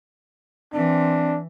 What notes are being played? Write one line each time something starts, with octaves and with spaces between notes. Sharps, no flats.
E3 C4 D4